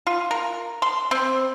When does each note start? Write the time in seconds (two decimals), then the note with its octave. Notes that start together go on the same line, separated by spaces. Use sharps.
0.07 F4
0.31 A#4
0.82 C6
1.11 C4